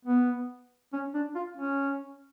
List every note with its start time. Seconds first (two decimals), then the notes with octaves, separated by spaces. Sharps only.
0.05 B3
0.93 C#4
1.14 D4
1.35 F4
1.57 C#4